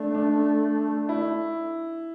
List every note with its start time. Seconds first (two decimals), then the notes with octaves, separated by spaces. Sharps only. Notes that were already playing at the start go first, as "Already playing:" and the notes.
Already playing: A3 D4
0.15 D4
1.09 E4